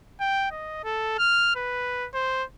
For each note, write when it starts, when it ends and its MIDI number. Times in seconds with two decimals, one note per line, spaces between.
0.20 0.50 79
0.51 0.83 75
0.84 1.16 69
1.18 1.53 89
1.56 2.07 71
2.14 2.44 72